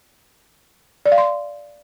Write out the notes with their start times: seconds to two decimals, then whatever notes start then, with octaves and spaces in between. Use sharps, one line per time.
1.06 D5
1.12 F5
1.18 C6